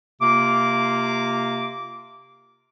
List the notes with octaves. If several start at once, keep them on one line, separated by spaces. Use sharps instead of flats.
C3 A#3 F4 D6